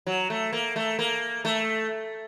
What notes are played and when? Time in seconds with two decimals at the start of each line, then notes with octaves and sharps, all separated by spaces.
0.06 F#3
0.30 A3
0.53 A#3
0.76 A3
0.99 A#3
1.45 A3